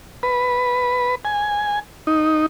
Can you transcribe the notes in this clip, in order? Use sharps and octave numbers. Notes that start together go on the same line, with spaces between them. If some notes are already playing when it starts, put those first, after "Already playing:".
B4
G#5
D#4